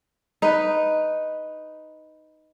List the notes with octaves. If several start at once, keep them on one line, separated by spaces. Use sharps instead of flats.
D#4 B4